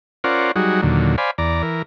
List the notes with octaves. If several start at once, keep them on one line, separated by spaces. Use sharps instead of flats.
C#4 F4 A#4 C5 D5 F#5
F#3 G3 D#4 F#4 G#4
D#2 A#2 D3 F#3
C5 D5 F5 G#5 B5
E2 D5 A#5
E3 A#4